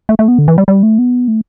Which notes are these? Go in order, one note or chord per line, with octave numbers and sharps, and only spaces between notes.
A3
A3
B3
D3
E3
G3
G3
A3
B3
A3